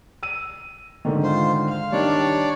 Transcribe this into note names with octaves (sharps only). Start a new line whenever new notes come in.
E6 D#7
G#2 D3 D#3
F4 C5
F5
D#3 G3 D4 C#5 D5